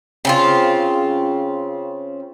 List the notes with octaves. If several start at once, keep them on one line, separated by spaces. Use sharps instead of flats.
C#3 C4 F4